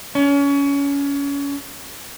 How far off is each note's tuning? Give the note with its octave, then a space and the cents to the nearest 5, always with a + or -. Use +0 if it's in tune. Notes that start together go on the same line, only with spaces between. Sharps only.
C#4 +25